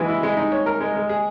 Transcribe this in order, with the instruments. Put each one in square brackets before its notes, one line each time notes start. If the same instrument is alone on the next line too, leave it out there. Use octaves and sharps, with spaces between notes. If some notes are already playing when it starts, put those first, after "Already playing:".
Already playing: [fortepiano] E3 G#3 F#4
E4
G#3
D#4
C#5
A#4
G#3
G#3
G#4